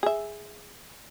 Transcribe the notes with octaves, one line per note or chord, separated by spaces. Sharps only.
G#4 E5